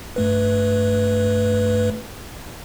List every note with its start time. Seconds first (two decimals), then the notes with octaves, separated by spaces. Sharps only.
0.16 G2 A3 B4